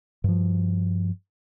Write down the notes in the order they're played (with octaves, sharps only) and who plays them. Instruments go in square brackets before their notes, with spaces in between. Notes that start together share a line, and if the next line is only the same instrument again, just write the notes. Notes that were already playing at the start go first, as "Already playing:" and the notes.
[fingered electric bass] G2 F3